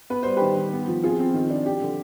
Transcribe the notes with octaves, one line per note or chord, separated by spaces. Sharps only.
B3 B4
G3 C5
D#3 G4 B4
D#3
B3
F3
C4 F4 G#4
C4
D#3
D4
F3 G4
D3